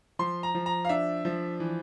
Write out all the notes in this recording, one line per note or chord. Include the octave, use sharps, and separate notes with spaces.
F3 C6
A#5
F3
A#5
F5
D4 E5
F3
E3